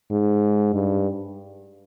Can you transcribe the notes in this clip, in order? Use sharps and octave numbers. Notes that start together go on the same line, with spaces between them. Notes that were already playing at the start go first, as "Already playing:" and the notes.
G#2
G2